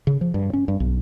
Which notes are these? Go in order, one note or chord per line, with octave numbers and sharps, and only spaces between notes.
C#3
F3
G2
C#4
G2
B1